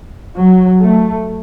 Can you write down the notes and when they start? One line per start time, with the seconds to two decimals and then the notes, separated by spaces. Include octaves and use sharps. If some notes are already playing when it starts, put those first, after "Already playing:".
0.35 F#3
0.81 A3